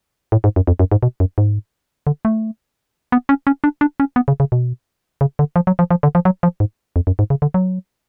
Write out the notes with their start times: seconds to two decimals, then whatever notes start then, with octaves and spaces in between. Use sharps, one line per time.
0.32 A2
0.44 G#2
0.56 F#2
0.67 F2
0.79 F#2
0.91 G#2
1.03 B2
1.20 F#2
1.38 G#2
2.07 D3
2.25 A3
3.12 B3
3.29 C#4
3.47 C#4
3.64 D4
3.81 D4
4.00 C#4
4.16 B3
4.28 C#3
4.40 C#3
4.52 B2
5.21 C#3
5.39 D3
5.56 F3
5.67 F#3
5.79 F3
5.91 F3
6.03 D3
6.15 F3
6.25 F#3
6.43 F3
6.60 G#2
6.96 F2
7.07 F#2
7.19 G#2
7.30 C#3
7.42 D3
7.54 F#3